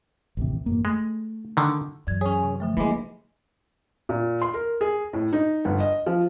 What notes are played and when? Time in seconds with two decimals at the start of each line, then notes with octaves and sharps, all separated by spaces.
0.37 A1 D#2 C3
0.66 A1 F#2 A#3
0.85 G#3 A3
1.57 D3 D#3
2.07 F#2 E3 G#6
2.21 C#4 G#4 C#5
2.43 C3
2.60 D3 F3 A3
2.77 E3 G#3 A#3 B5 D6
4.09 A#2
4.42 C6
4.54 A#4
4.81 G#4
5.13 A2
5.33 D#4
5.65 G1
5.80 D#5
6.06 F3